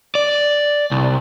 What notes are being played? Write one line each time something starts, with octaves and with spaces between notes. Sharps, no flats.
D5
C2